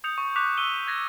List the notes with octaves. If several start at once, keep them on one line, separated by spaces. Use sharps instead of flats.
D#6 G6 C#7 F7
C#6
C#6 D6 F#6 B6 F7
C#6 E6 D#7 G7
F#6 G#6 A#6 B6 G7